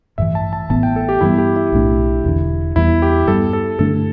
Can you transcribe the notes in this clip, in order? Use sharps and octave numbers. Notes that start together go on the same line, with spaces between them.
A1 G2 E3 E5
A5
A5
A1 A2 E3 B3 A5
G5
A4
G4
G2 E3 G3 B3 E4
G4
E4
B1 A2 A3 D4
E1 E2 D3
E2 E3 G3 B3 E4
G4
G2 G3 B3 A4
A4
G2 D3 A3 D4 A4